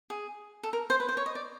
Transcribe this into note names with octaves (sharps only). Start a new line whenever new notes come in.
G#4
A4
A#4
C5
B4
C5
C#5
D#5
D5